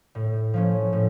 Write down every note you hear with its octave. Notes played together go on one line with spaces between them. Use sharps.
A2
F3 A3 C#4
A2